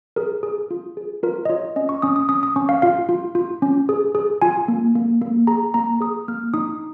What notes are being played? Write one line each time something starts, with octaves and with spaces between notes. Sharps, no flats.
G#4 A#4
G#4
F4
G#4
F4 A#4
D#5
F4 C#5
C#4 D#5
C#6
C#4 D#6
D#6
C#4 D#6
D#6
C#4 C#6
F5
F4 F5
F4
F4
C#4
G#4
G#4
F4 G#5
A#3
A#3
A#3
G#4 A#5
A#3 A#5
G#4 D#6
A#3 F6
D#4 D#6